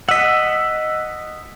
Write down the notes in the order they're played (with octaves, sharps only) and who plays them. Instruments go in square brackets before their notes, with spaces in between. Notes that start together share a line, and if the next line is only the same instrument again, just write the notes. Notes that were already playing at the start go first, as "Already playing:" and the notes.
[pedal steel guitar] D#5 F#5 [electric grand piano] E6 B6